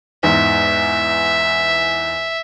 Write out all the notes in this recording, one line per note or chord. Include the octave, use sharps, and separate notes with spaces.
E2 G#2 E5